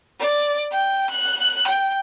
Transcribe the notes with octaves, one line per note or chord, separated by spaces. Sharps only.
D5
G5
F#6
G5